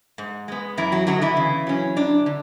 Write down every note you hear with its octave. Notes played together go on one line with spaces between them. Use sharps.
G#2
G#3 B3
F#2 E3 E4
F#3 F#4
D3 F#3 G#3 B3 F#4
E3 E4
C#3
F#3 C#4
F#2 D4
D3